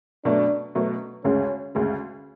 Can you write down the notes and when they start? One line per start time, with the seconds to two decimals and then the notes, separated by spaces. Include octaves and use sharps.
0.25 B2 F#3 A3 D4
0.75 B2 F#3 A3
1.24 D2 C#3 G#3 C#4
1.75 D2 C#3 G#3